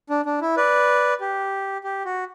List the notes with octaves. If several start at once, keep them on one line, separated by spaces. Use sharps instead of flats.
D4
D4
E4
B4 D5
G4
G4
F#4